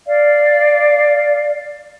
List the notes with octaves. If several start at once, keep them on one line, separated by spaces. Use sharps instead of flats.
D5 F5